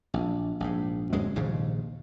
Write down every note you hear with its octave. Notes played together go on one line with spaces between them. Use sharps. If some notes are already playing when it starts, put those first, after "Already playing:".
A#1
A#1 G#2
D1 F#2 G#3
A#1 D#2 G#2 C#3